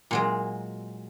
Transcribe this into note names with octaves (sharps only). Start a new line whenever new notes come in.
A#2 F#3 G#3